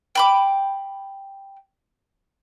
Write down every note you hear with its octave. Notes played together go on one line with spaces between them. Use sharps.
G5 B5 D6